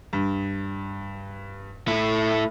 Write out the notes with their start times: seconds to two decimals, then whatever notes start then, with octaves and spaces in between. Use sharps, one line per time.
0.13 G2
1.88 A3 E4